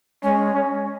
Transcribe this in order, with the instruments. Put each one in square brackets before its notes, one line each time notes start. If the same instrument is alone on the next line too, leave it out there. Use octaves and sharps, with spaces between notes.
[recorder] G#3 [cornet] C#4
[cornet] C#4